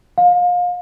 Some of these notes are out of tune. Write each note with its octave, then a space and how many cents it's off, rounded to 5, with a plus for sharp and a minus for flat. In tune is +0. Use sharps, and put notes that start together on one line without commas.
F5 +30